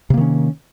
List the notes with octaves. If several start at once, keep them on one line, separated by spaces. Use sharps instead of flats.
C3 D#3 A#3 C#4